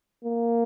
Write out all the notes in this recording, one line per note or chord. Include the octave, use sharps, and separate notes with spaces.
A#3